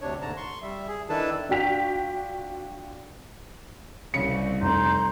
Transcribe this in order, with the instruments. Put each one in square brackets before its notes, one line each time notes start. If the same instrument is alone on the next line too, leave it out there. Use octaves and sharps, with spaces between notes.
[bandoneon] D2 C3 D4 C#5
D#2 G#2 D3 A5 A#5
C6 C#6
G3 E5
G#4
D#3 D4 E4 A4 B4 A5
[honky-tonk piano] D4 F4 F#4 G5 B6 F7
[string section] C2 [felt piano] C#3 C#7
[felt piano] F1 [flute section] A#5 C6 G6